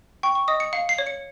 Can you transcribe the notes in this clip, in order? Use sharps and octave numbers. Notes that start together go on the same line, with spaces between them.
G5 C#6
C#6
D#5 D#6
C#7
F5 C#7
C7
C#5
C#7